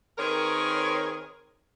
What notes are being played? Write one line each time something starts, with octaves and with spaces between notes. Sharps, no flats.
D#3 C4 G#4 A#4 B4 C#5